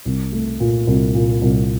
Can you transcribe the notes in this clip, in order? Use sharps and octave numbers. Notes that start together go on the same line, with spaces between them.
C2
A3
A#2
C2
A#2
C2